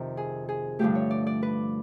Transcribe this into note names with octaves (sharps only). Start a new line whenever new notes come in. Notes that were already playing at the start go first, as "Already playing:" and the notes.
Already playing: F2 C3 D#3
G#4
G#4
G2 D3 F3 A3 G4
C#5
D5
D5
B4